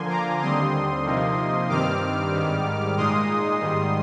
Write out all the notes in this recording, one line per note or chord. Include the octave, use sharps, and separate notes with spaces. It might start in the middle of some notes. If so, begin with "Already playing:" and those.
Already playing: D3 F3 A#3 G#5 C6
A#5 D6
D#2 D3 G3 C4 C6 D#6
C3 F3 A#3 D#4
G2 D#3 G3 C4 D6 F6
G#2 D#3 G3
A#2 G#3 D#4 C6 D#6
G#2 D#3 G3